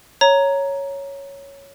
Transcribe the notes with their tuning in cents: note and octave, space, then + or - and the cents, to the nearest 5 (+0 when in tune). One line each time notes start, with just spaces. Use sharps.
C#5 +0 A#5 +0